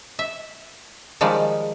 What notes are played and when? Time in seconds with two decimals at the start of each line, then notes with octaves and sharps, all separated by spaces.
0.19 E5
1.21 D#3 F3 G3 G#3